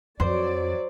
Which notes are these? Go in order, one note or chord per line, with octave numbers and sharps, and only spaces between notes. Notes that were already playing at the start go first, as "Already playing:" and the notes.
F2 F#3 C5 D5 C6